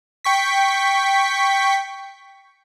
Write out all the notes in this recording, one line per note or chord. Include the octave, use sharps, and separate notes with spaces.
G5 C#6 B6